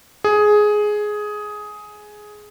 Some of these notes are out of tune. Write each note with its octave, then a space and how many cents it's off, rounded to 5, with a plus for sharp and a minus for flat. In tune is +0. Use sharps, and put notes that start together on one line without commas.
G#4 +10